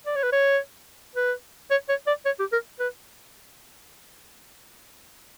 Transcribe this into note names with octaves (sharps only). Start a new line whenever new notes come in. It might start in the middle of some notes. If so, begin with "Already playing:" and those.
D5
C#5
B4
C#5
B4
C#5
C#5
D5
C#5
G4
A#4
B4